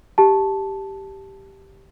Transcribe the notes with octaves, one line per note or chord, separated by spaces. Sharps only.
G4 A5